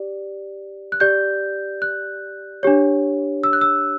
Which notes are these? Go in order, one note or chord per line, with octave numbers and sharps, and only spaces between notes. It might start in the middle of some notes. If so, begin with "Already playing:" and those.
Already playing: G4 D5
F#6
G4 D5 G6
F#6
D4 G4 C#5
E6
F#6
E6